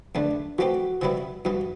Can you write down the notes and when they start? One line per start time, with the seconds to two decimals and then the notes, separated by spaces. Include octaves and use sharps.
0.15 E2 D3 A3 D4
0.59 E3 A3 C4 F#4 G4
1.01 C3 E3 G3 B3 E4
1.45 G2 E3 B3 F#4